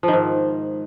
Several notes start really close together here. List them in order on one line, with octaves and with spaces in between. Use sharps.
F3 D#3 G#2